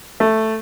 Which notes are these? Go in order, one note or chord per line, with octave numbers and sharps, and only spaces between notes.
A3